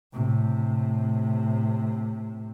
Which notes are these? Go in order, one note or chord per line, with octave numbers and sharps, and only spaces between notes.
A2 C3